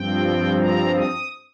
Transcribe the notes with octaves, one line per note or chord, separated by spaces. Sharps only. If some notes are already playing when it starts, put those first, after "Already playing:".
Already playing: G2 F3 C4 G5
A#5
D#6